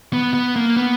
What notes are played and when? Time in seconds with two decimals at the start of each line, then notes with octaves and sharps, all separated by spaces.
0.13 B3
0.34 B3
0.56 A#3
0.77 B3